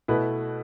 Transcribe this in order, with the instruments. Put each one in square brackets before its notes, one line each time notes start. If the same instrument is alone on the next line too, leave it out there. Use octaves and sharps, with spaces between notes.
[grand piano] B2 A3 E4 B4